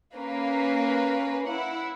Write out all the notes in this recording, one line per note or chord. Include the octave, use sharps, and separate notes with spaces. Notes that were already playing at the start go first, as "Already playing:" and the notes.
A#3 C#4 A#4 B4
E4 F#5